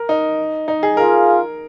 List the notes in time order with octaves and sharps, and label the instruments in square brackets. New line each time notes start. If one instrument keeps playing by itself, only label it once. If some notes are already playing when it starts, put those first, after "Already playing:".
Already playing: [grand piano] A#4
D#4
D#4
G#4
[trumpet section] F4 G#4 F5 [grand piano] A#4